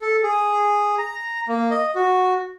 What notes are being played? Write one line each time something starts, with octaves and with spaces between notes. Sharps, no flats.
A4
G#4
A#5
A#3
D#5
F#4